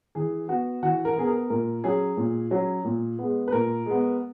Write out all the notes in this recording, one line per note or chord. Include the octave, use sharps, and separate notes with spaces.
E3 G#4
B3 F#4
E3 F#4
A#4
B3 G#4
A#4
A#2 A#4
F#3 C#4 G#4
A#2
F#3 C#4
A#2
G#3 B3
B4
A#2 A#4
G#3 B3